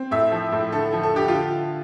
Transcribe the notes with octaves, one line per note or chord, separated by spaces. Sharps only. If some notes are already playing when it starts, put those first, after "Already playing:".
Already playing: C4
A2 E5
F3
A2
D3 A4
F3
A4
D3 G4
F4
D3